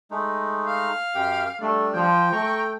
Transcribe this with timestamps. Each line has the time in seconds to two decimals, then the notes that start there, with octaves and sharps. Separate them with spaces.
0.11 G#3 A3 D#4
0.66 F5
1.15 F#2 G4 G5
1.61 G3 A3 D4 D5
1.94 F3 G5
2.32 A3 A#5 C#6